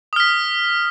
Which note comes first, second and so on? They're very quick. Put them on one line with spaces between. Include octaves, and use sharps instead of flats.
D#6 F6 B6